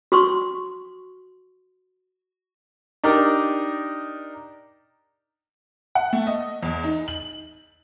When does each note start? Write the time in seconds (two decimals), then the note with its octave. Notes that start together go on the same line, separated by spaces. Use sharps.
0.12 F#4 C6 C#6
3.04 D4 D#4 G4 A#4 D5
5.95 F#5
6.13 A3
6.27 D#5
6.63 E2
6.84 D#4
7.08 F#7